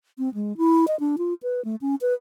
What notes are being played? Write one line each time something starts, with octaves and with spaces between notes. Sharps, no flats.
C4
G#3
E4
D#5
D4
F4
B4
A3
C#4
B4